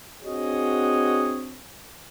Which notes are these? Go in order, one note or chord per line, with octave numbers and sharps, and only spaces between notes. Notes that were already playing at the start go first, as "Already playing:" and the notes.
C4 D4 F#4 G#4 C#5 D#5